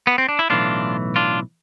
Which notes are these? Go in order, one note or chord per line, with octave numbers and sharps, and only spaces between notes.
B3
C4
D4
E4
B1 A2 E3 D4 F4
D4 F4